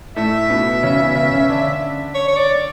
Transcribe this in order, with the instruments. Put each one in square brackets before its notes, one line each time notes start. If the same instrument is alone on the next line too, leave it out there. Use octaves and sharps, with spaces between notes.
[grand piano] A2 A3 [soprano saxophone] E5
[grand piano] B2 B3
C#3 C#4
C#4
B2 B3
C#3 C#4
C#3 C#4
D3 D4
[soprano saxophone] C#5
C#5
D5